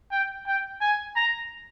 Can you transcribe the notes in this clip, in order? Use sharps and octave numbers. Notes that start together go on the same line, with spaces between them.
G5
G5
G#5
A#5